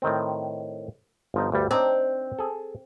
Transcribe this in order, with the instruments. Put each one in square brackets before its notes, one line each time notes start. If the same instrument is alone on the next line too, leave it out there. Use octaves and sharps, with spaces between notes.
[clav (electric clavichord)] A2 D#3 C4
G1 F3 D#4
D2 G2 G3
[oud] C4 [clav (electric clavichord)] D4 D#4 G5
[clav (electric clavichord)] G#4 A4